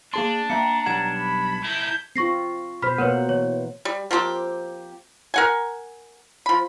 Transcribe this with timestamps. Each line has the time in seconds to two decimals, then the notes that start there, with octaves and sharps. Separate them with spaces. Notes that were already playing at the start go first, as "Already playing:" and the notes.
0.14 A#3 D4 G#4 A5 C6
0.50 A#3 E5 G5 A#5 C#7
0.86 B1 G3 F#5 G#6 E7
1.19 B5
1.64 E4 A#4 G6
2.16 C4 F4 C#6 A#6 C7
2.82 B2 C5 B5 F6 B6
2.98 B2 A#3 A#4 B4 C#5 F#5
3.29 E3 C#5
3.85 G3
4.11 F3 A#3 C4 G4
5.34 A#4 F#5 G#5
6.46 F3 B5